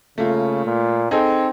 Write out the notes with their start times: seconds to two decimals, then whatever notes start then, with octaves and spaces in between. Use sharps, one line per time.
0.18 C#3 A3 A#3 F4
0.65 A#2
1.11 C4 D#4 G#4 A4